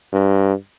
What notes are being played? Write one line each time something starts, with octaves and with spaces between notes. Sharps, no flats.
G2